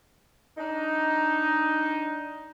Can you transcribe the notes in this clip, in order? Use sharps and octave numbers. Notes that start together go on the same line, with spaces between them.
D4 D#4